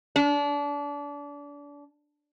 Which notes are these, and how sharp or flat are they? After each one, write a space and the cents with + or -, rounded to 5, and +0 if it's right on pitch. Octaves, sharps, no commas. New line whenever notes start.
D4 -30